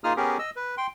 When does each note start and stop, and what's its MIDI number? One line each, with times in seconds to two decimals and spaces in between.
0.04 0.13 58
0.04 0.13 63
0.04 0.13 65
0.04 0.13 68
0.04 0.13 87
0.04 0.13 89
0.17 0.38 59
0.17 0.38 61
0.17 0.38 67
0.17 0.38 68
0.17 0.38 70
0.39 0.50 75
0.39 0.50 88
0.56 0.75 71
0.78 0.87 79
0.78 0.87 84